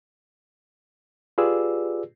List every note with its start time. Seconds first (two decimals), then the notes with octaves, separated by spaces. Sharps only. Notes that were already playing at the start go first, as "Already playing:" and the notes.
1.38 F4 G4 G#4 B4 D5 E6